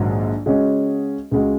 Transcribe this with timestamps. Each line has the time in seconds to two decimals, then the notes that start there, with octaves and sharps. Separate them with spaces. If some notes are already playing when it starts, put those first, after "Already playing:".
Already playing: A#1 G#2 D#3 F#3
0.46 C#3 G#3 C#4 F#4 D#5
1.31 C#2 C#3 G#3 F#4